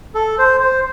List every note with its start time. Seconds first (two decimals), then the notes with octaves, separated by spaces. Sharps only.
0.15 A4
0.38 C5
0.61 C5